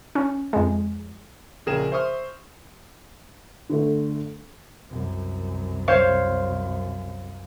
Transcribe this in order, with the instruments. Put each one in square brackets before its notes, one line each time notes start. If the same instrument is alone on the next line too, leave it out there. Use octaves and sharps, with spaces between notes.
[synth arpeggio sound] C#4
F2 G#3
[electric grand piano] A#1 C#3 G#4 A#4 G5 E7
C5 E5 C6 C#6 D#6 F6
[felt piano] D3 A3
[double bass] C2 F#2
[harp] C5 C#5 F5